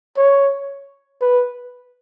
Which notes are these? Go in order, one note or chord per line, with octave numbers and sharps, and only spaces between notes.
C#5
B4